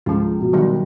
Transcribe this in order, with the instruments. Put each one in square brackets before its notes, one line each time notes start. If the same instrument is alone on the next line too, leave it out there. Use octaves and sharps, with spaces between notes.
[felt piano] C#2 [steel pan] F3 F4
[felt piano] B2
[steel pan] D#3 F#3 G3